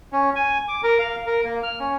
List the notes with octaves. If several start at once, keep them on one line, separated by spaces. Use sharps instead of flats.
C#4
G#5
D6
A#4
F5
A#4
A#3
F6
C#4